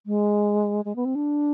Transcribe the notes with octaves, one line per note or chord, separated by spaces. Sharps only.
G#3
G#3
B3
C4
D4